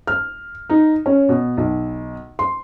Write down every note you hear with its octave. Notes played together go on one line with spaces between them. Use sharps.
F6
D#4
C#4
B2
B1
C6